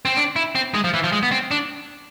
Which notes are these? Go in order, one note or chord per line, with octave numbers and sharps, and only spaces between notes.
C4
D4
E4
C4
G#3
F3
E3
F3
G#3
B3
C4
D4